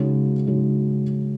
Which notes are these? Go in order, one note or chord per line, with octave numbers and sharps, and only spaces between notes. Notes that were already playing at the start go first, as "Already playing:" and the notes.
Already playing: C#3 G#3 D#4 F#4
C#3 G#3 D#4 F#4